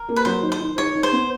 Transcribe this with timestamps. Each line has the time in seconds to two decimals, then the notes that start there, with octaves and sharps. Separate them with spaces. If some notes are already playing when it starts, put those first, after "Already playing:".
Already playing: A#4
0.09 A#3
0.16 B4
0.25 F#3 C5
0.42 D#3
0.52 C5
0.60 D#3
0.78 D#3 C#5
0.95 D#3
1.03 C5
1.12 B3